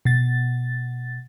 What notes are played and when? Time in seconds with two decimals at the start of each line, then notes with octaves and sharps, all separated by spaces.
0.05 B2 A6